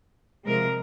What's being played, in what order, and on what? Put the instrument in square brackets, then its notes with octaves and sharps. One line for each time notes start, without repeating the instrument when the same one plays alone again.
[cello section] C3 F3 G#3 A#4